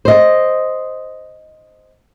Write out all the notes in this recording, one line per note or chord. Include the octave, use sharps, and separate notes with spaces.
C5 D#5